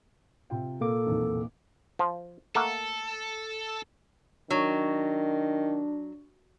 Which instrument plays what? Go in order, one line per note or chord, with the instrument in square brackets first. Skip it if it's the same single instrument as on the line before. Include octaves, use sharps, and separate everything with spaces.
[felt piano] C3 F4 G5
[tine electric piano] A#2 A#3 D6 [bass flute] A4
[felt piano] F1 B1 E2
[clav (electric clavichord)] F3
[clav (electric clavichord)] A3 A#3 F#5 [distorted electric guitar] A4
[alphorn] D#3 [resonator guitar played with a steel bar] F#3 [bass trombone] D4